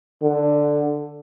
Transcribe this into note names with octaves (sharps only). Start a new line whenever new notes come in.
D3